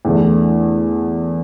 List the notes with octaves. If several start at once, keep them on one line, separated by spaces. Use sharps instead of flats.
E2 D3 A3